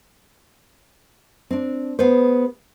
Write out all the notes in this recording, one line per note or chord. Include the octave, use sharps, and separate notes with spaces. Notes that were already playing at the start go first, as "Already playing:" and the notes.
C4 D4
B3 G#4 B4 C5